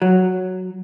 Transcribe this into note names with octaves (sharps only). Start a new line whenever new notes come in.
F#3